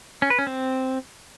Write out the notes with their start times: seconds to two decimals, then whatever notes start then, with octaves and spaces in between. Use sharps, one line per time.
0.22 C#4
0.30 B4
0.39 C#4
0.47 C4